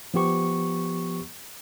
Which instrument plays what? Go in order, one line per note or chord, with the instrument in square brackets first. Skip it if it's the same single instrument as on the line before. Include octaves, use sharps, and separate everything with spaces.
[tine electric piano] F3 B3 G4 C#6